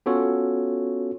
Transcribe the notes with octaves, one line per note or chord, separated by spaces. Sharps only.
B3 C#4 F4 F#4 A4 C#5